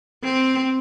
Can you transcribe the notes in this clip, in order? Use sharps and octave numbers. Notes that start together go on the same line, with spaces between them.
C4